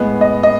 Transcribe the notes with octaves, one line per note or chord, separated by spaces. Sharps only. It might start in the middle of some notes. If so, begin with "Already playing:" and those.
Already playing: A2 G#3 B3
D#5
D#5